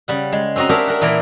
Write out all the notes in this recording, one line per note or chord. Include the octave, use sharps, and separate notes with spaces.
C#3 G3 F#5
G#3
C4 C#4 F#4 D#5 A#5
D4 G4 G#4 A#4 C#5 E5
A#4 F#5
A#2 E3 A#4 D5 A#5